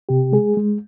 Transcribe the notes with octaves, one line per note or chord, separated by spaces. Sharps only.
C3 G4
G#3 G#4
G#3